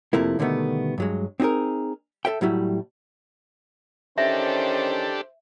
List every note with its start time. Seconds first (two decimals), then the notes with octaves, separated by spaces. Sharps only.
0.13 F2 C3 F3 A3 A#3 E4
0.39 B2 D3 D#3 G3 A3 B3
0.98 G2 F#3 G#3
1.40 C4 D#4 F#4 G#4 A#4
2.25 A4 A#4 E5 G5
2.41 A2 F#3 G3 E4
4.18 D#3 E3 C#4 D4 G4 A4 C5 E5